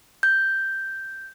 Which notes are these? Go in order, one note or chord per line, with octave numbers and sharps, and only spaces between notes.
G6